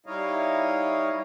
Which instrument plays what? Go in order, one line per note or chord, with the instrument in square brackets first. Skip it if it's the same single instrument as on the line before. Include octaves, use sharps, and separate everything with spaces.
[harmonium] G3 D#4 E4 C#5 D#5 F5